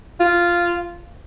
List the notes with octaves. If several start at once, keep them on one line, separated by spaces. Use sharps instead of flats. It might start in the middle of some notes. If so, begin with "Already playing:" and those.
F4